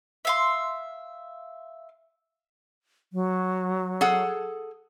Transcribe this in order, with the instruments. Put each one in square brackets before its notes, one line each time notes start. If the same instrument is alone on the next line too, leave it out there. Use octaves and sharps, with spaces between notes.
[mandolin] E5 F5 C6
[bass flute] F#3
[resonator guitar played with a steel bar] G#4 A4 F#5